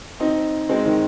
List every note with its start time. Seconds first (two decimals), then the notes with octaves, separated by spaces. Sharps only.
0.20 C4 D#4
0.69 G#3 C4
0.85 D#3